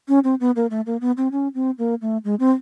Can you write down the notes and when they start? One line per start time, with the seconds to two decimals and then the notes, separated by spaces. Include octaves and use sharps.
0.08 C#4
0.24 C4
0.40 B3
0.56 A#3
0.70 A3
0.86 A#3
1.01 B3
1.17 C4
1.32 C#4
1.55 C4
1.78 A#3
2.01 A3
2.24 G#3
2.40 C4